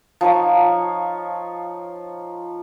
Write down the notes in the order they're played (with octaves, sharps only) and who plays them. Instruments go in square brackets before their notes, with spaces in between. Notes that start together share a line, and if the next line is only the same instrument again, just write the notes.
[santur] F3 D#4 C#5